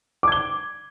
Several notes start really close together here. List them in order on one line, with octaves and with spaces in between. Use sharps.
D6 G#6 G7